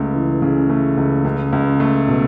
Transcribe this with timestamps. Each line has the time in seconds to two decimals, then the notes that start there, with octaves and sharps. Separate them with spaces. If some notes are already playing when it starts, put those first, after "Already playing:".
Already playing: C#2 A3
0.14 E3
0.42 C#3
0.70 A3
0.97 C#2
1.24 C#2
1.53 C#2
1.80 A3
2.08 B2